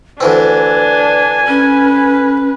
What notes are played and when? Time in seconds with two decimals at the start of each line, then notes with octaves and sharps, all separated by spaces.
0.20 D2 E3 C4 D4 B4 G#5
1.48 C#4 B4